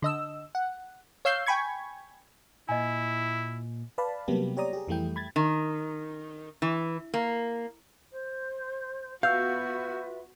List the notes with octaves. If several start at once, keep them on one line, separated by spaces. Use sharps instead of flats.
D3 D#5 E6
F#5
C#5 F5 E6 G6 C7
G5 G#5 B5 C#6 G#6
A#2 E4 D#5 G#5
B4 D5 F5 A5 B5
C3 F#3 G3 A#3 B3 G4
G4 C#5 D5 A#5 D#6
G4 G#4
F2 E3 G3 A3 E4 G5
B5 G#6 A6
D#3
E3
A#3
C5
B3 F4 F#4 B4 E5 F5 E6 G6